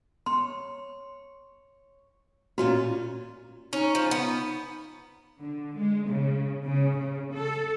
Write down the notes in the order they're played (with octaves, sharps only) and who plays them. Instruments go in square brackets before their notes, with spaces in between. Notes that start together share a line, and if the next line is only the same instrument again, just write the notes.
[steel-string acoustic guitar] C#5 [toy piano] C6
[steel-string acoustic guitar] A#2 C#4 F4 [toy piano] F#4
[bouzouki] C#4 [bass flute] D#4
[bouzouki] F3
B3
[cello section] D3
G#3
C#3
C#3
C#3
A4